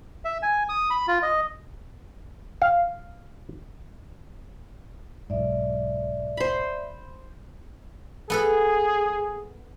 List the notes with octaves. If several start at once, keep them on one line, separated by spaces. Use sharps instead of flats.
E5
G#5
D#6
B5
F4
D#5
F5
B1 G#2 D5 E5
C5 B5
B3 G#4 A4 B4